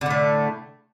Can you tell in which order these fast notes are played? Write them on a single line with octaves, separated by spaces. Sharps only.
D3 A2 A3